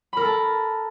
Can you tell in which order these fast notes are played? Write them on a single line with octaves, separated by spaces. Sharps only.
B5 A#4 A4 A5